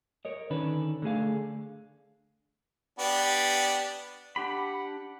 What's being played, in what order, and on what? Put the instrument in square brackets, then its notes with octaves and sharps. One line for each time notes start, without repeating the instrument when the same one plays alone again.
[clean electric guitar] A#4 C#5 D#5
D3 D#3 C#4 D4 B4
D3 A3 G#4 F5
[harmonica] B3 D4 G4
[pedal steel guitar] D4 G4 B5 [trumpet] F#5